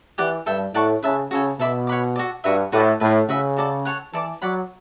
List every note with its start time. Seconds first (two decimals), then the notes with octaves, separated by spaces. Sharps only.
0.18 E3 G4 D5 F#5
0.46 G2 A4 E5 G5
0.74 A2 D5 F#5 A5 C#6
1.03 C#3 B4 E5 A5
1.31 C#3 F#4 A4 C#5
1.59 B2 A4 E5 B5 D6
1.87 C#5 F#5 B5 D6
2.16 F#4 A4 D5
2.44 G2 F#4 B4 E5
2.72 A2 F#4 B4 D5 F#5
3.00 A2 B4 E5 A5
3.29 C#3 F#4 B4 E5
3.57 F#4 A4 D5 A5
3.85 A4 C#5 F#5
4.13 E3 A4 D5 A5 D6
4.42 F#3 D5 F#5 B5